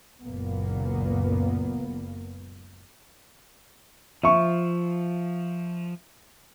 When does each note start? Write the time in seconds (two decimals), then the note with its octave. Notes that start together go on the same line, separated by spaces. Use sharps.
0.23 F#1 C#2 F#2 A#2 A#3 B3
4.24 F3 E5 C#6